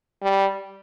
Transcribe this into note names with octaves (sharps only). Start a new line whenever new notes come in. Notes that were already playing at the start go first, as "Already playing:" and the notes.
G3